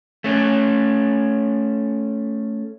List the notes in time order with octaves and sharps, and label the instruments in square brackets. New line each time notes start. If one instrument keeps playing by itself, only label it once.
[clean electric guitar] A3 C#4